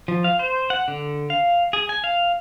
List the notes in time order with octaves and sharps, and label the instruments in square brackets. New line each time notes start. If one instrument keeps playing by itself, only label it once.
[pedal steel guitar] F3
F5
C5
F#5
D3
F5
G#4
G#5
F5